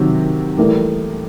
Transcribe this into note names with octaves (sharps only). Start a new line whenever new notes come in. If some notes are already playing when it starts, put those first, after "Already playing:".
Already playing: C3 D#3 F#3
A2 E3 G3 A#3